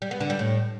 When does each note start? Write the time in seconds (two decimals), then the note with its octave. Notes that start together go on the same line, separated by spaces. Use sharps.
0.02 G3
0.11 B3
0.20 D3
0.30 G3
0.39 A2